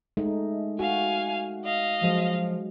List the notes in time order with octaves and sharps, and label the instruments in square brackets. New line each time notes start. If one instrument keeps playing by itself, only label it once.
[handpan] G#3 A3 D#4
[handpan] F#4 [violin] F5 G#5
[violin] D#5 F5
[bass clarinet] F3 [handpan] F#3 G#3